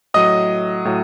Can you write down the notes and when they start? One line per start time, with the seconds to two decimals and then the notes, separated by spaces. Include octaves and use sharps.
0.14 A2 F#3 D#5 D#6
0.85 A2 F#3